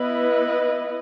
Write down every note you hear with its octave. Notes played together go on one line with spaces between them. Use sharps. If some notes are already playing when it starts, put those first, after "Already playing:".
Already playing: B3 E4 B4 D#5